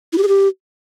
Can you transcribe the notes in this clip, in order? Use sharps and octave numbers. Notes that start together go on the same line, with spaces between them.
E4
G4
G#4
G4